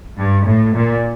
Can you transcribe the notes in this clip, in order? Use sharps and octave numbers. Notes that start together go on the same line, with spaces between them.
G2
A2
A#2